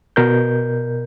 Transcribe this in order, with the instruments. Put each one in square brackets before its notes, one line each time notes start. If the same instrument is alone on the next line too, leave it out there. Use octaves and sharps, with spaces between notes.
[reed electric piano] B2 A#4 G6